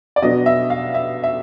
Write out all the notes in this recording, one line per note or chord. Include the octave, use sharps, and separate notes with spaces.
D5
B2 F#3 B3 D4 D#5
E5
F5
E5
E5